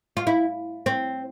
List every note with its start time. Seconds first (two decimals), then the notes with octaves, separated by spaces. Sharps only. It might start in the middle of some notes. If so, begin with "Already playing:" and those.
0.17 F4
0.27 E4
0.86 C4